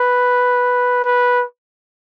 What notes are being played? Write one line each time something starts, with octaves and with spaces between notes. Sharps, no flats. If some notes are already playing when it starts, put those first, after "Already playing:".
Already playing: B4
B4